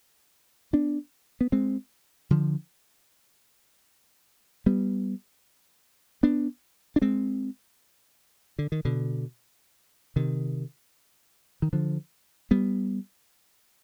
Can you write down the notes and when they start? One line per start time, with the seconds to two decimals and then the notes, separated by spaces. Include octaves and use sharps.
0.73 B3 D4
1.41 B3
1.52 G#3 C4
2.31 D3 F3
4.66 G3 B3
6.23 B3 D4
6.96 D4
7.02 G#3 C4
8.59 D3
8.72 D#3
8.85 B2 D3
10.16 C3 D#3
11.62 D#3
11.73 D3 F3
12.51 G3 B3